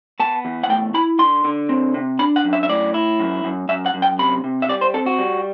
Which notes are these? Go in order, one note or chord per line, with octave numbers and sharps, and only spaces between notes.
B3 A5
E2
F#5
A3 G5
E4 B5
D3 C6
D3
C4
C3
D4 B5
F#5
F#2
E5
E5
A2 D5
E4
F#2
F#2
F#2 E5
F#5
F#2
G5
C3 B5
C3
E5
G3 D5
C5
C4 A4
F#4
G3